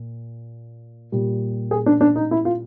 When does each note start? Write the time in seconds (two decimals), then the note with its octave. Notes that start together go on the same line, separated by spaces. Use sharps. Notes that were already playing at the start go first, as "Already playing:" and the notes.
Already playing: A#2
1.12 A#2 G3
1.71 G#4
1.86 D4
2.01 D4
2.16 D#4
2.31 E4
2.45 F4